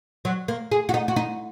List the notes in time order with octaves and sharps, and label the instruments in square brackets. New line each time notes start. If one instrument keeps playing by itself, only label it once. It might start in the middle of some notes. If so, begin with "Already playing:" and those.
[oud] F#3
A#3
G#4
F#4
D#4
F#4
D#4